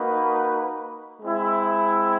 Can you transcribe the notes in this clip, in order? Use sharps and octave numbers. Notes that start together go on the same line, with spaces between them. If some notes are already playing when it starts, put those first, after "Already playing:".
Already playing: A#3 D#4 F#4 B4
G#3 C4 E4